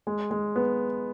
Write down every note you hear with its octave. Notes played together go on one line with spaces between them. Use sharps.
G#3
G#3
B3